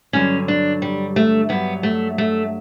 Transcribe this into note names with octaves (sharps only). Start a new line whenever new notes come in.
G2 D3 F#3 C#4
D4
G3
A3
G2 F#3 B3
A3
A3